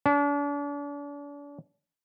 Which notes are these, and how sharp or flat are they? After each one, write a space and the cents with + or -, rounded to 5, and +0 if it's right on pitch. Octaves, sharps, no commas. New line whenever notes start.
D4 -40